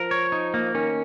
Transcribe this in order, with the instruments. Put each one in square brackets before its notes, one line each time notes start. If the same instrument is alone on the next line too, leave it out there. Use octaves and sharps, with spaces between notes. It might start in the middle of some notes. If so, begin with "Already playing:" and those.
Already playing: [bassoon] F3 [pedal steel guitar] A#4
[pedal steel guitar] C#5
D#4
A#3
[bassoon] D#3 [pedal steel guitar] C#4